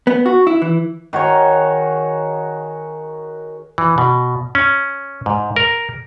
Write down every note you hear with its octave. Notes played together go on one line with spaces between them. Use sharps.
B3
F#4
E4
E3
D#3 F#4 G#4 C#5
E3
B2
C#4
G#2
A#4